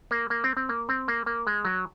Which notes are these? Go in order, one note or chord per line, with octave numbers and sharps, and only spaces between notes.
A#3
A#3
C4
C4
A#3
C4
A#3
A#3
G#3
F#3